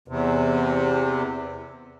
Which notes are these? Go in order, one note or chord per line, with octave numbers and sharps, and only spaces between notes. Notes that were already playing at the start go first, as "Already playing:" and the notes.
E2 C3